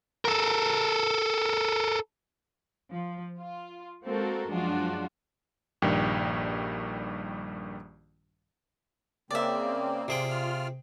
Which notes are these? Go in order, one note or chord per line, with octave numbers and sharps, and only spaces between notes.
A4 A#4
F3
F4
G#3 A#3 C4 F#4 A4 A#4
F#2 F3 G#3 D4 F4 F#4
A#1 G2 D#3 G3 G5
C#3 A#3 C4 D5 E5
C3 F4 G#4 G5
F4 F6